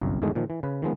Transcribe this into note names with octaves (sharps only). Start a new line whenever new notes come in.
G1 C2 F#2
E2 G#2 D3 D#3 G#3 A3
A#2 D#3 F3
E3
C#3 B4
D#3 F3 G#3 B3